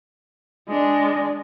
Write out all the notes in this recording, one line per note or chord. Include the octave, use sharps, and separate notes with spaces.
G#3 D4